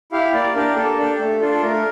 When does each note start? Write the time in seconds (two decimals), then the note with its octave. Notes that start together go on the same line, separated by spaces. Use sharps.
0.12 E4 G4 F5
0.34 A#3 D5
0.55 D4 G4 A#4
0.76 A#3 A4
0.98 D4 G4
1.19 A3
1.41 D4 F4 A4
1.53 A4
1.62 A3 A#4